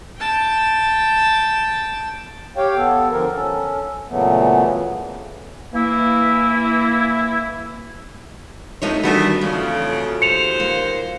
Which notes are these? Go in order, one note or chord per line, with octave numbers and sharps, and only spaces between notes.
G5 A5
G4 C#5 F5 G5
B3 A4
D3 F3 A#4
C#4 A4
A#2 C#3 E3 F#3 A3 B3
E3 A#3 E4
C3 E3 F3 A3 D#4 C#5
D#3 E3 G3 A3 B3 D4 F4 F#4
F2 C#3 A3
D#2 C5 C#7 F7
A#3